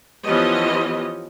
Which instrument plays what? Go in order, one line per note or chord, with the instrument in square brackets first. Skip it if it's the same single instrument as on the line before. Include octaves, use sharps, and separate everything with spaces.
[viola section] E3 F3 B3 C#4 G4 D#5